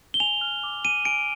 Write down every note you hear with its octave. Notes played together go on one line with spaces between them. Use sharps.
G7
G#5 F7
F6
D6
G#5 D#7
G#5 D7